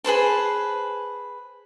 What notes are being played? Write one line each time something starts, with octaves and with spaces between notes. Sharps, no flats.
G#4 B4 C5 A5